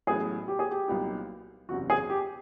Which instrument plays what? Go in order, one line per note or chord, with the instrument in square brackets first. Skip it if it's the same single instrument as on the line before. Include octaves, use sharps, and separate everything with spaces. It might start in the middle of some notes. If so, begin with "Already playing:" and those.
[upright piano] A1 A2 F#3 B3 [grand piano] G#4
[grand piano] G4
G#4
G4
[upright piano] C2 A#2 F#3 B3 D#4
[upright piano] F#1 E2 C3 [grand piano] F#4
[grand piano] G#4
G4